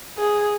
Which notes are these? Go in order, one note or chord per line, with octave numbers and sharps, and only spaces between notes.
G#4